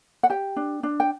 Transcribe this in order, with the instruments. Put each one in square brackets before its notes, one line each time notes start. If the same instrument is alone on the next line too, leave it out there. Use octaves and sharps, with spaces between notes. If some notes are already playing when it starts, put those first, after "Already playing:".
[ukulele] F#5
G4 G5
D4
D4
G5